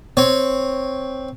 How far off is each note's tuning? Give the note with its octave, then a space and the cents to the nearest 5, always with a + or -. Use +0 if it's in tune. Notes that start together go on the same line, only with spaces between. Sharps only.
C4 +0 C#5 +0